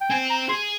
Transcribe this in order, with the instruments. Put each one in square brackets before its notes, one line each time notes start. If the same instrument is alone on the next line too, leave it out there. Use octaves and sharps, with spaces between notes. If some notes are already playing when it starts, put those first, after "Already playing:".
[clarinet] G5
[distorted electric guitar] C4 [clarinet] G#5
[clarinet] A#5
[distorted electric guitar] G#4 [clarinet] C6